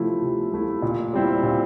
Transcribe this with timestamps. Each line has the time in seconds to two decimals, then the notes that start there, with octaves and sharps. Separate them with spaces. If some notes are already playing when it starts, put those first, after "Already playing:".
Already playing: C3 F3 A3 E4
0.22 C3
0.52 F3 A3 E4
0.82 A#2
1.13 G3 C4 E4
1.43 A#2